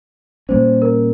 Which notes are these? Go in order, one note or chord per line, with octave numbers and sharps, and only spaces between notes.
A#2 G3 A#3 C#4 C5
A#4